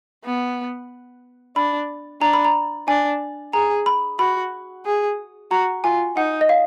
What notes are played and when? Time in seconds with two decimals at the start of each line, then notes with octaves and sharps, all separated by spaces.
0.24 B3
1.56 D4 B5
2.21 D4 A#5
2.33 B5
2.45 A#5
2.88 D4 G#5
3.53 G#4 A#5
3.86 B5
4.19 F#4 B5
4.85 G#4
5.51 F#4 A#5
5.84 F4 G#5
6.16 D#4 F#5
6.41 D#5
6.49 F5